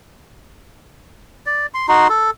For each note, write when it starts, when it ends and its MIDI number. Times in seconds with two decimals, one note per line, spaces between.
1.46 1.66 74
1.74 1.86 84
1.89 2.08 63
1.89 2.08 66
1.89 2.08 84
2.09 2.31 69